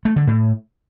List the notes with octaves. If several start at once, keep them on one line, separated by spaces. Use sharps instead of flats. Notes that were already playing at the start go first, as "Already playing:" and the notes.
A3
D3
A2